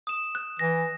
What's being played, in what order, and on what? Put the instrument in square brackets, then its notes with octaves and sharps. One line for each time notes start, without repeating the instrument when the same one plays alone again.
[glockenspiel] D#6 E7
F#6
[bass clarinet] E3 [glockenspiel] A#6